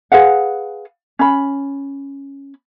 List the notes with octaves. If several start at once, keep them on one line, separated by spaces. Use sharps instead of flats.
G#4 B4 F5 F#5
C#4 B5